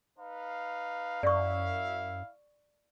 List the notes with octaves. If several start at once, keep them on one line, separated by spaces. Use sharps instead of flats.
D#4 B4 F5
F#2 E4 D5 E5 F5 C#6